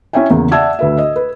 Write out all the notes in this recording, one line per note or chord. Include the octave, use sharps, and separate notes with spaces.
C#4 E4 C#5 E5 G5 G#5
E2 C#3 A#3
D5 E5 F#5 A5 E6 G#6
D2 B4 E5
D#5
B4